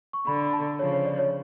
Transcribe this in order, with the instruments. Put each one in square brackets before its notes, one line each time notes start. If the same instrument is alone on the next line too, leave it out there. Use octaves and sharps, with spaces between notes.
[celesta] C#6
[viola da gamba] D3 [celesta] B5
[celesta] A5
[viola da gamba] C#3 F3 [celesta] C#5
[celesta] C#5
D5
C#5